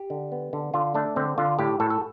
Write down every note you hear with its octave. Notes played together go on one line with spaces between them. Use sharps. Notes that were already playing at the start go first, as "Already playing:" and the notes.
Already playing: G4
D3
B3
D3
D3 F4
A3 D4
D3 C4
D3 F4
A2 G4
A2 A4
A4